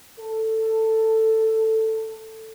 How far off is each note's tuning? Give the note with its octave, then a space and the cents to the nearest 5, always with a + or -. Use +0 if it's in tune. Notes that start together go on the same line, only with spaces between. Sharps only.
A4 +10